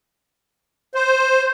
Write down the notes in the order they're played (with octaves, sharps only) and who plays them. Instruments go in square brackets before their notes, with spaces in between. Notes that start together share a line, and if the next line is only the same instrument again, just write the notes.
[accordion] C5